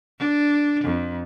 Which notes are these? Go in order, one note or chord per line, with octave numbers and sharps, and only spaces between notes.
D4
F2